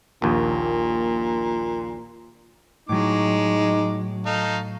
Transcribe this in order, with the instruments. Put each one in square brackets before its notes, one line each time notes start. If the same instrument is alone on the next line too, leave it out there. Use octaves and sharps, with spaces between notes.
[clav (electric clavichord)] A#1 D#2 [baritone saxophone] A#2
[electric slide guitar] A2 F#3 [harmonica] G#3 D6 [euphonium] D#4
[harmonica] D#4 A4 F5